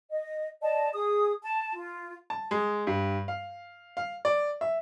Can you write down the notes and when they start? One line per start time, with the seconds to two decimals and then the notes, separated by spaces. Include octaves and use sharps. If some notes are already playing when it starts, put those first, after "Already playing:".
0.10 D#5
0.63 D5 D#5 A5
0.93 G#4 D#6
1.43 A5
1.73 F4
2.30 A5
2.51 G#3
2.87 G2
3.28 F5
3.97 F5
4.25 D5
4.61 E5